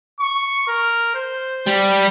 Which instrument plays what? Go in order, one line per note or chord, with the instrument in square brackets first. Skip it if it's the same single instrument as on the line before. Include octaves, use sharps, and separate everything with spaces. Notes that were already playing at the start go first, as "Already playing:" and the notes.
[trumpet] C#6
A#4
C5
[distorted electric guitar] G3